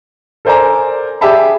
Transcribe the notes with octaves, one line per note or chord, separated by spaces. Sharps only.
A4 A#4 C5 D5 G#5 A#5
G4 G#4 D5 E5 A5 B5